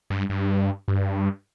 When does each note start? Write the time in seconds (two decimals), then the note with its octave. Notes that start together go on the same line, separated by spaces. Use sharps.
0.10 G2
0.30 G2
0.88 G2